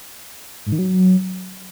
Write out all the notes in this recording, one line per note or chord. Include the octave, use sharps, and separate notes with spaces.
G#2
D#3
F#3